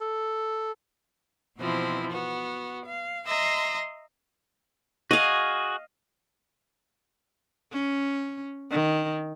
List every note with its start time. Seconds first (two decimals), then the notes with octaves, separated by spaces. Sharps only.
0.01 A4
1.57 B2 E3 F3 C4 E4
2.11 B3 F#4
2.85 F5
3.27 D#5 E5 A#5 C6
5.11 F#4 G#4 D#5 F5
7.72 C#4
8.70 D#3